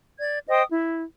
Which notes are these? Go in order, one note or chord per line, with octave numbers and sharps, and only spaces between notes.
D5 G#6
C5 D#5 G5 D#6
E4